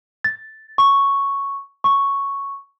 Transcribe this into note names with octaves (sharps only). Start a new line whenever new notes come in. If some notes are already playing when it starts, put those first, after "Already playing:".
A6
C#6
C#6